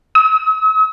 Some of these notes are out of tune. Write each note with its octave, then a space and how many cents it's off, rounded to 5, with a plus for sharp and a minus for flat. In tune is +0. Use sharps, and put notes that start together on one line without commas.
E6 -45